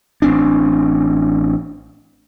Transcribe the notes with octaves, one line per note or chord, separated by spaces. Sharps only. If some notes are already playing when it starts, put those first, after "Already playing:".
A1 C4 D4